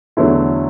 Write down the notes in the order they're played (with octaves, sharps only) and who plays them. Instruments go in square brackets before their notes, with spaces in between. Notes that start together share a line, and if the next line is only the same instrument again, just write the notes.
[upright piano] E2 D3 F#3 A3 E4